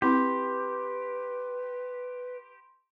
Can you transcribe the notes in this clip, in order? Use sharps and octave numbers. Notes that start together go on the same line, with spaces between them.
C4 E4 G4 B4 B5 C6